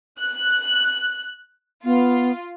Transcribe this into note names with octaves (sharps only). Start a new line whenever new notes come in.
F#6
B3 F4